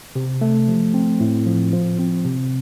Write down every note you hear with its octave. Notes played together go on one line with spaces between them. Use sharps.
C3
A3
F3
C4
A2
F3
F3
C4
C3